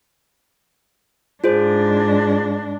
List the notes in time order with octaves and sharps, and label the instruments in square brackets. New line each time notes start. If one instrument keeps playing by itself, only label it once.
[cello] G#2 D4 [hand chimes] F4 G#4 C5